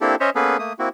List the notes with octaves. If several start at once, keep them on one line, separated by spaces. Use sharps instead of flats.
A#3 C4 D4 E4 G4 A4
C#4 C5 C#5 D#5 E5
A#3 B3 C#4 G#4 A4 B4
A3 A#3 D#6
A#3 C4 E4 F#4